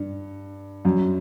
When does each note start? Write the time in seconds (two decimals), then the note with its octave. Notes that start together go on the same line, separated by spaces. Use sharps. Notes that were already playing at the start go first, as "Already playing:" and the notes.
Already playing: G2
0.85 F#2